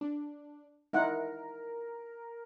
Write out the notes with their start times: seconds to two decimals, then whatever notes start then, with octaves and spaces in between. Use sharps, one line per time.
0.01 D4
0.93 D#4 E4 A#4 F#5